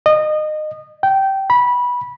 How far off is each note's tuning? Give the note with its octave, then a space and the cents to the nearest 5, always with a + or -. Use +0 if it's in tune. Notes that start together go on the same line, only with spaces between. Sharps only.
D#5 -25
G5 -15
B5 -15